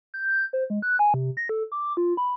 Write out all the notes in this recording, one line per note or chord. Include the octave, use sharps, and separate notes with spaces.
G6
C5
G#3
F#6
G#5
C3
A#6
A4
D6
F4
B5